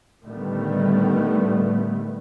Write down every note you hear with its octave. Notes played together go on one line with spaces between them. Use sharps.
A2 D3 D#3 G3 A3 B3